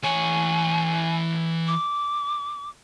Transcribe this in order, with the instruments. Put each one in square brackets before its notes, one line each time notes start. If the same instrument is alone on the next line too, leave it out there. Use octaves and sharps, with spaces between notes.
[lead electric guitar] E3 C#5 [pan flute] G#5
[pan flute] D6